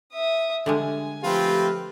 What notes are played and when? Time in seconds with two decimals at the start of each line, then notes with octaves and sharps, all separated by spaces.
0.12 E5 D#6
0.66 D3 G3 G#3 G#5
1.23 F3 A3 C4 F4 G4 B4